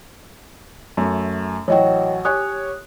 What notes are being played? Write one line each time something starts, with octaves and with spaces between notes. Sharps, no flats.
F#2 A3
A1 F#3 F#4 C#5 D#5 G5
G4 C#5 G#5 D#6 F#6